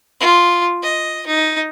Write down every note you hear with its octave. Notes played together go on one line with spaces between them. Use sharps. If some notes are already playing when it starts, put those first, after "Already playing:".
F4
D#5
D#4